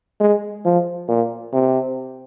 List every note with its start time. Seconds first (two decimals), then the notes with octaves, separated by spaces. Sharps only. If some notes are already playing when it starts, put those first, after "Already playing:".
0.20 G#3
0.65 F3
1.09 A#2
1.53 C3